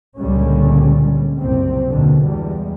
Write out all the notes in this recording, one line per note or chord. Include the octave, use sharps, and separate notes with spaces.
C#2 A#2 D3 G3 G#3 C#4
F#1 C2 C3 C4
D#2 B2 D3
E2 G3 G#3